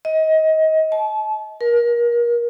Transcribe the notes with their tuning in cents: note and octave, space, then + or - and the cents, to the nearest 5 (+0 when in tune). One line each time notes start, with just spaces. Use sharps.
D#5 +25
A5 -35
A#4 +30